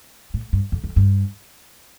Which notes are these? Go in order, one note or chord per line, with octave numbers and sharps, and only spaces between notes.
A2
G2
F2
F2
G2